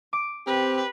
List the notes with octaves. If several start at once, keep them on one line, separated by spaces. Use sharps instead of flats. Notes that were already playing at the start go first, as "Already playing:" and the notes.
D6 D7
C4 G4 B4